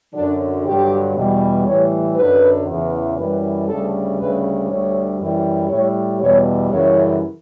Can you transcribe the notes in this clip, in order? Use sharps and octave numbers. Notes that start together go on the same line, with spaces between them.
F#2 D3 F#3 D4
G2 D3 F#3 G4
E2 B2 G3
A2 E3 G3 C#5
F#2 D3 F#3 B4
E2 C#3 E3
F#2 E3 G3 B4
D2 C#3 G3 A4
D2 C#3 G3 B4
D2 D3 G3 C#5
F#2 E3 G3
A2 G3 C#5
E2 B2 G3 C#5
F#2 C#3 E3 G3 C#5